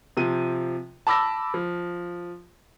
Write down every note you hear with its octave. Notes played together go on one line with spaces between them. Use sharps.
C3 F3 D#7
A5 B5 D6 E6 A#6
F3